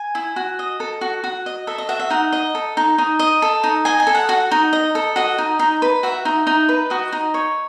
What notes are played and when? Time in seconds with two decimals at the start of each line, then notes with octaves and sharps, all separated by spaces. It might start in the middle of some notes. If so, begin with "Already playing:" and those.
Already playing: G#5
0.15 E4
0.36 F#4
0.59 D#5
0.80 A4
1.01 F#4
1.24 F#4
1.46 D#5
1.67 A4 E5
1.78 D#5
1.89 F#4 E5
1.99 E5
2.10 D#4 F#5
2.32 D#5
2.55 A4
2.77 D#4
2.98 D#4
3.19 D#5
3.42 A4
3.64 D#4
3.85 D#5 G#5
4.00 G#5
4.07 A4
4.15 F#5
4.29 F#4
4.51 D#4
4.73 D#5
4.95 A4
5.16 F#4 D#5
5.38 D#4
5.59 D#4
5.82 B4
6.03 F#4 E5
6.25 D#4
6.47 D#4
6.69 B4
6.90 F#4 D#5
7.12 D#4
7.34 C#5